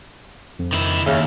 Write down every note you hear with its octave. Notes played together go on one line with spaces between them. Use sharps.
F2
D#3 E4
D#2 C#3 E5 F6